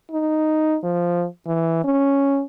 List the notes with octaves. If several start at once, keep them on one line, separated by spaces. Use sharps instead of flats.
D#4
F3
E3
C#4